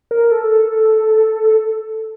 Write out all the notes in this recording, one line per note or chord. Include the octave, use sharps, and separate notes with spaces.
A#4
A4